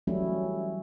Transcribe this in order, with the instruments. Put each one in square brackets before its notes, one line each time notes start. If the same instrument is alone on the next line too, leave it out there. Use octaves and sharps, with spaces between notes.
[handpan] E3 F#3 G3 A3 C#4 E4